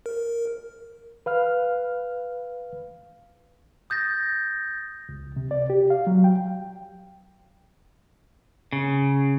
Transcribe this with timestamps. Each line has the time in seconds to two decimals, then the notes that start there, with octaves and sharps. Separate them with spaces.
0.06 A#4
1.26 B4 F5 F6
3.90 D#6 G6 A6 A#6
5.09 C#2
5.36 C3
5.51 D5
5.70 G4
5.90 F5
6.07 F#3
6.24 G5
8.72 C#3